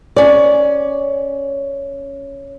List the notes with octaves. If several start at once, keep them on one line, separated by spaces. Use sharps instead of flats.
C#4 D5